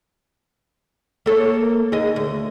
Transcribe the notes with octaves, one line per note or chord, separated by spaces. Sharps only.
A#3 A4 C#5
D#2 G#4 D#5
D2